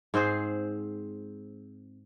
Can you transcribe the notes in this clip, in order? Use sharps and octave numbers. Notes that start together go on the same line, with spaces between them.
G#2 C4 G#4 C5